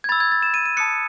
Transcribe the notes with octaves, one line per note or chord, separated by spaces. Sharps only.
G#6
B5 E6 A6
G#6
A6
E7
D#7
D#7
A5 D#6 F#6 C#7